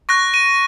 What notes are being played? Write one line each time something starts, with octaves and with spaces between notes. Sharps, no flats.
C#6 F#6 A#6
D#7